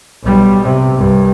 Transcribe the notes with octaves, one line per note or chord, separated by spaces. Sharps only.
B1 G3
C3
C2 G2